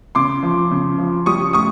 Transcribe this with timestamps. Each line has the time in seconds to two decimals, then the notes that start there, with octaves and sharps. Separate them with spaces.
0.15 C#3 C6 D6
0.43 F3
0.71 C#3
0.98 F3
1.26 G3 C#6 D#6
1.53 A2 C#6 D#6